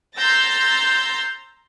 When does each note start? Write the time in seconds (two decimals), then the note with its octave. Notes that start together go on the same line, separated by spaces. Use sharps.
0.16 A#5 C6 E6 G6 A6 A#6